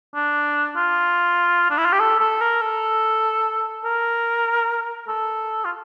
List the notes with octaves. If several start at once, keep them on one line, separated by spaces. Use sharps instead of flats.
D4
F4
D4
E4
F4
G4
A4
A4
A#4
A4
A#4
A4
F4